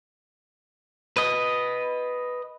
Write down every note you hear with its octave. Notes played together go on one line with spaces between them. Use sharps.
B4 D#5